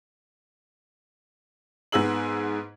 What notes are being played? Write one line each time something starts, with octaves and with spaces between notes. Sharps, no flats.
G#2 B3 G#4 E6 F#7